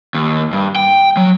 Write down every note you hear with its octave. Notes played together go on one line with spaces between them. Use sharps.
D#2
G2
G5
F#3